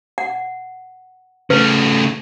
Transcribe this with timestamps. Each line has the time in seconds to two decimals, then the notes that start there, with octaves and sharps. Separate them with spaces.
0.18 F#5
1.50 C#3 A3 B4